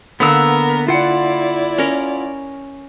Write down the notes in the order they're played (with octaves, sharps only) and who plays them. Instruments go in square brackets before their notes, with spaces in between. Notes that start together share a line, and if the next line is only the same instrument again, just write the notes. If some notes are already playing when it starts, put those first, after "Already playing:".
[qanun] D3 A#3 [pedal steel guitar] B3 B4 E6 [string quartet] A#4
[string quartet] E4 D5 [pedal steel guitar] F4 F#5
[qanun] C#4 A#4